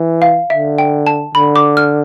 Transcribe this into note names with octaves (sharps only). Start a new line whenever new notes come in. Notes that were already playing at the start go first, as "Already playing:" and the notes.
Already playing: E3
F5
D3 E5
G5
A5
D3 B5
D6
F6